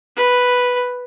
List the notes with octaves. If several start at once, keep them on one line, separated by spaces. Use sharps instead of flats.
B4